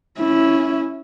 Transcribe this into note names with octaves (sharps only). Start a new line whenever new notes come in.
C#4 E4